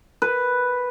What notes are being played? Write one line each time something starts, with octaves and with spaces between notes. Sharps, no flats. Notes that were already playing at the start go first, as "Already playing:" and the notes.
B4